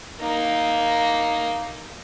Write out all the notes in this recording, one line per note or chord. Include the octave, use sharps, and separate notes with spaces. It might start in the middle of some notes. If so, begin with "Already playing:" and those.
A#3 D#4